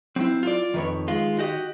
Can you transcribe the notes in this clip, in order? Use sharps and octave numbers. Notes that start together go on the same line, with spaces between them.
F#3 C4 E4
F4 D5
F2 D#3 B4 C#5
G#3 F4
F#4 G4 D#5